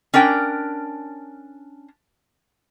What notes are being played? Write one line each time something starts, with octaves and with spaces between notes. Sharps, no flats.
C#4 D4 A#4 G5